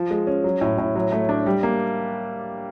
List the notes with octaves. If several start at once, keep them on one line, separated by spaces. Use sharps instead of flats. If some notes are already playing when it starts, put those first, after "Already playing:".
Already playing: F3
G#3
C#4
F#3
A2
A2
F#3
A3
D4
G3
A#3